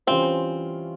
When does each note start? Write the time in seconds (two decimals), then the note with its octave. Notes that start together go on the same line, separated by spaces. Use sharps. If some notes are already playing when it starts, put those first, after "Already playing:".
0.07 E3 G3 C4 C#4 F4 C5